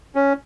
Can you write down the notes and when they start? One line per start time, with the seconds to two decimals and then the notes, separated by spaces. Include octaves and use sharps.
0.15 C#4